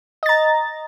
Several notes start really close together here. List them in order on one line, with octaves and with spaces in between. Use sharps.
D#5 A6 A#5